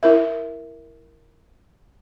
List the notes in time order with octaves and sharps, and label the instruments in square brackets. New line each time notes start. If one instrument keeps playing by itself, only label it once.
[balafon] E4 A#4 E5